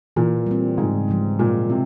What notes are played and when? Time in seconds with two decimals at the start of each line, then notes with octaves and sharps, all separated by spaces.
0.16 A#2 E3
0.46 G3 C4
0.78 G#2 C#3
1.08 F3 G#3
1.39 A#2 G#3
1.69 C3 E4